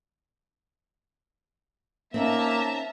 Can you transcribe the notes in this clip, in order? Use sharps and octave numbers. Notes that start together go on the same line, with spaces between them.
A#3 C4 C#4 D#4 E5 A5 A#5